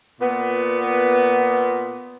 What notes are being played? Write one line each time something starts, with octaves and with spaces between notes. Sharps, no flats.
A#2 B3